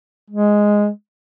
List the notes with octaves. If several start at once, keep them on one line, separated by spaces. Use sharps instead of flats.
G#3